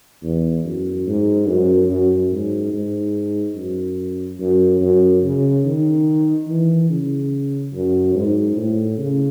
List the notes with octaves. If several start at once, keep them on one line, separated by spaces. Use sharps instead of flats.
E2
F#2
G#2
F#2
F#2
G#2
G#2
F#2
F#2
F#2
C#3
D#3
E3
C#3
F#2
G#2
A2
C#3